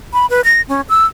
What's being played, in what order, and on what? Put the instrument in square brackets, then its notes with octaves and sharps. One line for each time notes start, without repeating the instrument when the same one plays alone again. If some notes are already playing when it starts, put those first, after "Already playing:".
[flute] B5
B4
A#6
C#4
E6